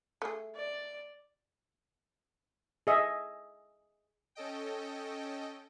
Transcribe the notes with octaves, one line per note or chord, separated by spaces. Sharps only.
A3 G#4
D5
G#4 D#5 E5
C#4 A4 D#5 G5